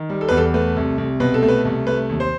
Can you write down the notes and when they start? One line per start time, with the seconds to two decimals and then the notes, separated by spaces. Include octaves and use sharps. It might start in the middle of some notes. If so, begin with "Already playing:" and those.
Already playing: D#3
0.10 G3
0.21 A4
0.29 E2 B4
0.37 A4
0.54 A3 B4
0.76 C2
0.98 C2
1.20 B2 B4
1.34 A4
1.43 A3
1.48 B4
1.65 C2
1.87 A3 B4
2.10 D#2
2.20 C5